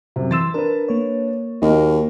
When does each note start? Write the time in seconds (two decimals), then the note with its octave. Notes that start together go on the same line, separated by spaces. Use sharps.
0.16 F#2 C3
0.31 E3 C6 E6 A6 E7
0.54 D4 A#4 B4
0.88 A#3 C#5
1.62 D#2 F#4 A#4 D#5